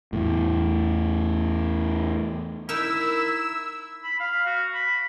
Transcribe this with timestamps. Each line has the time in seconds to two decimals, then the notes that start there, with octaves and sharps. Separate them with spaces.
0.13 E2 A2
2.69 D#4 E4 A#4 E6
4.04 B5
4.20 F5
4.46 F#4
4.74 B5